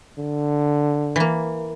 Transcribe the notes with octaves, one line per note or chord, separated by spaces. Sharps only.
D3
E3 A#3